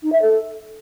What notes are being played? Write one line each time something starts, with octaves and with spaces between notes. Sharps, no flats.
D#4
E5
A4